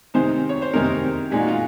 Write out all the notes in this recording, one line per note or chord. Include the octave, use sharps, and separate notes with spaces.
C3 D#3 G#3 C4 D#4 C5
C#5
C5
C3 D#3 G#3 C4 D#4 A#4
A#2 G#3 D#4 G#4
F#4
F4